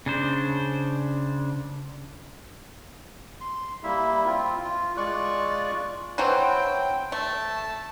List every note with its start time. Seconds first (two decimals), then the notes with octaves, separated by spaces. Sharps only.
0.06 C#3 D4 C5
3.41 C6
3.84 G3 A#3 E4 E5
4.26 C4 F4
4.63 F4
4.97 G#3 F4 D5 C#6 F#6
6.18 E3 F#3 C4 G5
7.12 A3 A5